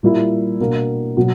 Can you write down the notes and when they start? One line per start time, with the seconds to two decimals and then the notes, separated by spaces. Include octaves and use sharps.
0.03 A#2 G3 A#3 E4
0.60 B2 A#3 D4
1.17 B2 F#3